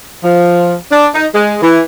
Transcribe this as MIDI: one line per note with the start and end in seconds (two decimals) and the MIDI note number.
0.24 0.73 53
0.92 1.08 62
1.14 1.27 63
1.34 1.57 56
1.62 1.81 52